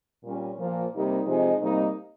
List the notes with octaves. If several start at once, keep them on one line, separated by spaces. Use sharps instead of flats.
A#2 G3 C#4
A#2 F3 A#3
C3 G3 A#3 D#4
C3 F3 G#3 D#4
C3 G3 A#3 D#4